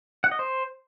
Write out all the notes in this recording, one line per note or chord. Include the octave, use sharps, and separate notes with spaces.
F#5
D#5
C5